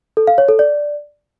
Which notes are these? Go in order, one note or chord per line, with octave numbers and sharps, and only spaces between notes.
A4
F5
C#5
A4
D5